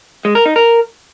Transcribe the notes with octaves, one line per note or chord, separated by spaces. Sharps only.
G#3
A#4
D#4
A#4